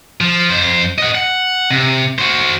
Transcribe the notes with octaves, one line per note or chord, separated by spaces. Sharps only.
F3
F2 C5
D#5 F#5
F#5
C3
F#4 C5